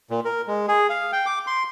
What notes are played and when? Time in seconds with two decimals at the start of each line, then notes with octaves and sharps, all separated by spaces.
0.10 A#2
0.25 A#4
0.47 G#3
0.68 G#4
0.89 F5
1.12 G5
1.26 D6
1.47 C6